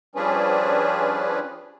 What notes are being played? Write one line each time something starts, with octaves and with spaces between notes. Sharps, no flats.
F3 G3 C#4 D4 G#4 B4